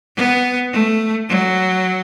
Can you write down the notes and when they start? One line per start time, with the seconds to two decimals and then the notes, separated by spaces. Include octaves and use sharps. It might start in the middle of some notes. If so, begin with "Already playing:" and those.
0.17 B3
0.73 A3
1.29 F#3